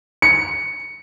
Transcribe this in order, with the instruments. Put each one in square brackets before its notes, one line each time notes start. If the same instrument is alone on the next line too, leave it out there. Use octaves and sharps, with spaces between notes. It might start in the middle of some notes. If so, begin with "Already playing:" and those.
[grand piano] C#7